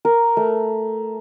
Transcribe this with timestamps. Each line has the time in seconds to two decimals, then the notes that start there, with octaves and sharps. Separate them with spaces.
0.05 A#4
0.37 A3